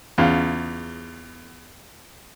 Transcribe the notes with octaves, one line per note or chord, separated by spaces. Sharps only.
E2 C#3 F4